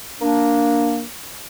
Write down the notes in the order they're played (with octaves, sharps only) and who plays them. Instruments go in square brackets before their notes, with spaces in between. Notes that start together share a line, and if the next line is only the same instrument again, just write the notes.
[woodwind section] A#3 D4